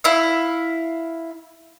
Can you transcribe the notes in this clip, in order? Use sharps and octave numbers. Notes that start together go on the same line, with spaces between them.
E4 F5